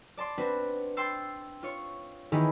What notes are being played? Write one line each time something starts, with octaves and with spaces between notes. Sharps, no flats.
D5 A5 C6 D6
C4 D4 F#4 B4
G5 C6 E6 A6 C7
F4 C#5 C#6
D#3 E3 B3 E4 G4 G#4